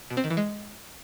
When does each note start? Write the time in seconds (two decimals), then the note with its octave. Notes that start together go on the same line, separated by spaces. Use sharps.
0.10 B2
0.17 C4
0.24 D#3
0.30 E3
0.37 G#3